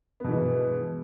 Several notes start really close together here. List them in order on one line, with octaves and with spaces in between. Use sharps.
B3 B2 E3 G#3